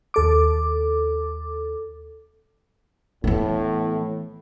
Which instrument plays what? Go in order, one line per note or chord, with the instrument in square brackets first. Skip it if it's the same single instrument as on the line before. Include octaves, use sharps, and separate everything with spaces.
[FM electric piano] D#2 A4 D6
[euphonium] A2 [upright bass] E3 B3